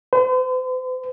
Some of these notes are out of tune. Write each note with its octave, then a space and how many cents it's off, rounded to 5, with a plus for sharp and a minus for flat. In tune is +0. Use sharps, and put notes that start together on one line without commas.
C5 -45